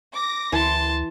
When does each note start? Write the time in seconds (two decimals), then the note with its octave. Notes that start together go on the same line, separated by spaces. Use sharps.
0.13 D6 A#6
0.52 D2 E3 A5 C6